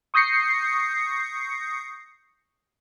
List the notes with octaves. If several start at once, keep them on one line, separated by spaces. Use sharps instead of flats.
C#6 D#6 G6 A#6 C7 C#7